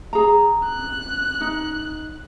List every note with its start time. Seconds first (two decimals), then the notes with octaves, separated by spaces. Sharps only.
0.13 G#4 A#5
0.65 F#6
1.41 D#4